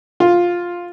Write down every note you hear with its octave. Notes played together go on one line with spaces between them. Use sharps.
F4